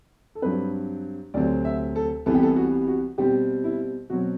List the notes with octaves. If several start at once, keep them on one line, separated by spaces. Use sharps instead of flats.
A4
G2 F#3 C4 B4
D2 C3 F#3 C4 D5
E5
A4
C2 C3 E3 G3 B3 A4
G4
A4
F#4
F#4
B2 G3 C4 G4
E4
B2 F#3 C4 F#4